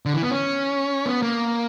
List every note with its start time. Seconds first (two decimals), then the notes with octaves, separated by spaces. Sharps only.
0.06 D3
0.14 E3
0.22 B3
0.31 C#4
1.06 B3
1.22 A#3